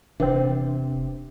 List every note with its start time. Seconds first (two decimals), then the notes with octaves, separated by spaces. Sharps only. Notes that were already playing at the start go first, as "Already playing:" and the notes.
0.20 E1 C3 E3 B3 C4 D4